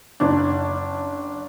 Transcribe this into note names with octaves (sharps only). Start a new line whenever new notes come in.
F#1 D4